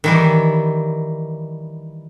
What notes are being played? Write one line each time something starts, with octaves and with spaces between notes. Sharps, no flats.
D#3 E3 G3